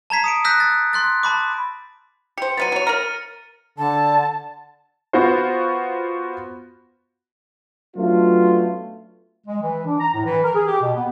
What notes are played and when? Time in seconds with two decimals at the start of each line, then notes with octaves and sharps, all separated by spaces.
0.10 A5 A#5 G#6 B6 C7
0.24 D#6 C#7 D7
0.44 D#6 E6 F#6 G6 A#6 B6
0.60 A6
0.93 C6 F#6 A6
1.23 A5 B5 D6
2.38 G4 C5 C#7
2.57 F#3 G#3 B3 A6 D#7
2.72 F#3 C#5
2.87 A#4 A#5 F6
3.78 D3 A5
5.13 B3 F4 F#4 C5
7.97 F#3 A3 B3 C#4 D4 F4
9.47 G#3
9.61 E3
9.86 D4
10.00 A#5
10.14 A2
10.25 E3
10.44 A#4
10.55 G#4
10.67 G4
10.82 B2
10.95 B3